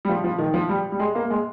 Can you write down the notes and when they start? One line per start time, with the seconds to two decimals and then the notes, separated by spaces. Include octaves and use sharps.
0.05 G3
0.09 F3
0.24 F3
0.38 D#3
0.54 F3
0.69 G3
0.92 G3
0.99 G#3
1.15 A#3
1.30 G#3